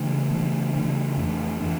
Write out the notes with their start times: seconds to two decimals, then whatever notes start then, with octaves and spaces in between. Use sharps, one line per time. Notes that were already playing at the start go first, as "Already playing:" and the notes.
Already playing: C#3 E3 A3 D4
0.30 C#3 E3 A3 D4
0.74 C#3 E3 A3 D4
1.18 F2 E3 A3 D4
1.61 E3 A3 D4